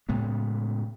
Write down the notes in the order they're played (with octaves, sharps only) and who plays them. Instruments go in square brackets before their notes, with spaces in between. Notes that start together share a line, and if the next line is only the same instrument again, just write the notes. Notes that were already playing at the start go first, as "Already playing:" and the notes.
[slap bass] A2 C#3 G#3 B3